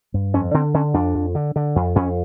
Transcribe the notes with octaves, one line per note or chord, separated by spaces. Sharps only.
G2
F2 C#4
D3 C4
D3 C#4
F2 D4
F2
D3
D3
F2
F2 C#4